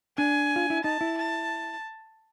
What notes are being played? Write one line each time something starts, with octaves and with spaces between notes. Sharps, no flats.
D4 G#5
F4
E4
D#4 A5
E4
A5